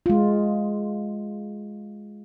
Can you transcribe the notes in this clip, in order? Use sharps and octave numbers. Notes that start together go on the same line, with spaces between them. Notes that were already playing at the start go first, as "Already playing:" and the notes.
G#3 F4